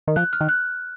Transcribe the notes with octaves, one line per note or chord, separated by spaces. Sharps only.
D#3
F3 F#6
F6
D#3
F#6